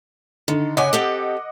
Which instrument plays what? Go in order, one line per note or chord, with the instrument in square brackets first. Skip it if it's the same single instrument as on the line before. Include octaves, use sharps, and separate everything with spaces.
[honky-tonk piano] D3 [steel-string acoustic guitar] D#3
[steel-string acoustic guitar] C#3 G#5 [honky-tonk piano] D#5 F#5 D6
[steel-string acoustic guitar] C4 G4 A4